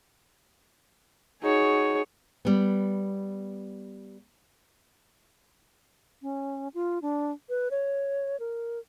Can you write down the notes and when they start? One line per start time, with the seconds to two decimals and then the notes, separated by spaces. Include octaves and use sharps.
1.42 D#4 F#4 G#4 C#5
2.45 G3 B3
6.22 C#4
6.74 F4
7.02 D4
7.49 B4
7.71 C#5
8.40 A#4